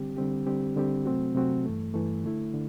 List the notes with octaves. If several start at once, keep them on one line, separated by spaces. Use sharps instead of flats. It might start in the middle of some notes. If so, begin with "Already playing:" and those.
Already playing: D3 G3 C4 G4
D3 G3 C4 G4
D3 G3 C4 G4
D3 G3 C4 G4
C3 F#3 A3 C4 F#4
C3 F#3 A3 C4 F#4
G2 E3 A3
G2 E3 A3
D3 A3 E4
D3